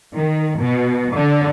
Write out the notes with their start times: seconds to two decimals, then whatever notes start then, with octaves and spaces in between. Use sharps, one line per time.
0.15 D#3
0.59 B2
1.15 D3